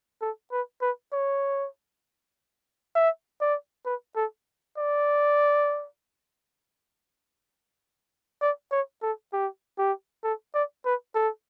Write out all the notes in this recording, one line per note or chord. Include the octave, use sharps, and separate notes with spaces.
A4
B4
B4
C#5
E5
D5
B4
A4
D5
D5
C#5
A4
G4
G4
A4
D5
B4
A4